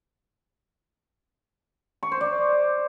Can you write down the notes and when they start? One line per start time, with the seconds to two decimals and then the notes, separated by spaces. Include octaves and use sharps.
2.03 C#6
2.12 C5
2.21 D5